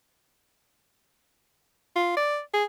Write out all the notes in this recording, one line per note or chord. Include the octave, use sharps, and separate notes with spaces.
F4
D5
G#4